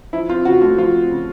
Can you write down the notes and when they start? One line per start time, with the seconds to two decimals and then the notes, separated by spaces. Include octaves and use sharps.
0.13 F3 E4
0.29 C4 F4
0.45 C#3 F#4
0.61 A3 F4
0.78 F3 F4
0.94 C4
1.11 C#3